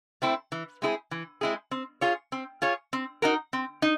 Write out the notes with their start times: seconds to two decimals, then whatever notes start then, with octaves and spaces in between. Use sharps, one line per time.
0.22 A3 C4 E4
0.52 E3
0.82 G#3 C4 E4 G#4
1.11 E3
1.41 G#3 C4 E4 G#4
1.71 C4
2.01 F4 G#4 C#5
2.32 C4
2.62 F4 G#4 C#5
2.93 C4
3.22 D#4 F#4 A#4
3.53 C4
3.82 D#4